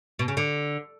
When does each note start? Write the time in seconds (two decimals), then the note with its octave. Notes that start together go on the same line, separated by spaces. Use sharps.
0.19 B2
0.28 C#3
0.37 D3